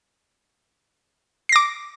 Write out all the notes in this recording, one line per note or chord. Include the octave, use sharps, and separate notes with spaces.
D6 A#6 C7